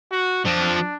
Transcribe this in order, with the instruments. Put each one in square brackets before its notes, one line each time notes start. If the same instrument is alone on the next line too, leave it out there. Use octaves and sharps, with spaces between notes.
[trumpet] F#4
[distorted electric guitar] F3 C4 [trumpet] D4